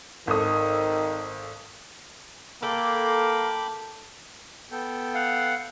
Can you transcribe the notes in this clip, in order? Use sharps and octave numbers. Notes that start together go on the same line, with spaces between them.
G#1 D#3 A4 D#6
A#3 A4 G5 B5 D6
B3 A4 G5
F5 F#5